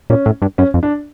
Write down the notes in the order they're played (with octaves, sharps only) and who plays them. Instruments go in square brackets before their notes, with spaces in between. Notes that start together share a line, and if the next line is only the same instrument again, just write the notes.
[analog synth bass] A#2 [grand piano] C#4
[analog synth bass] A2
G2
[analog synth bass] F#2 [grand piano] C#4
[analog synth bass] F2
[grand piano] D4